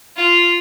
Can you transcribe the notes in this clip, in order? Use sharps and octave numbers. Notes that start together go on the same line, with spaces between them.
F4